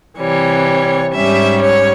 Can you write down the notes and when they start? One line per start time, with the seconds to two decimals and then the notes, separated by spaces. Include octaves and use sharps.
0.19 C3 E3 G3 C#5
1.13 G#2 G3 C#4 E5
1.62 C#5